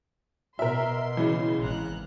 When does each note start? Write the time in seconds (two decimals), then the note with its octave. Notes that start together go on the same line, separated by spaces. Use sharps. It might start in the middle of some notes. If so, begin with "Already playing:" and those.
0.59 B2 A#4 E5 C6
1.17 C#3 E3
1.61 G#1 A#5 F#6